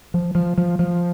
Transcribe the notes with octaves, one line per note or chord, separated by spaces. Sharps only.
F3
F3
F3
F3